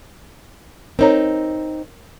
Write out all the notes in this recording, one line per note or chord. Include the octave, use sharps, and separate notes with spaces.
C4 D#4 A#4 C#5 A#5